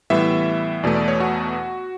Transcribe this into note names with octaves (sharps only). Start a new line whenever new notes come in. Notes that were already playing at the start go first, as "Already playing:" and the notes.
A2 E3 G3 B3 E5
E2 B2 A3 D5
D5
C#5
F#4